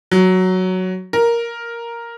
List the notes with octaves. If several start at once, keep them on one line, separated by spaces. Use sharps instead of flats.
F#3
A#4